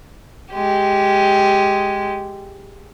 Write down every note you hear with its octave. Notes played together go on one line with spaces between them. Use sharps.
G#3 G4